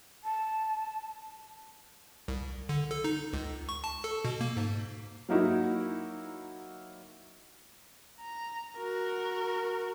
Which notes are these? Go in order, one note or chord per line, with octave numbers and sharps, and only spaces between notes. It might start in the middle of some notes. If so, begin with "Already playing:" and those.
A5
C2
D3
A4
D#4
C#2
C#6
A5
A4
B2
A#3
G#2
F#3 A#3 D#4 E4 F#4
A#5
F#4 A#4